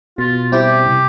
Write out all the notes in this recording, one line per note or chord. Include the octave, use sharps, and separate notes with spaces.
B2 F4
G3 C4 E4 G4
C3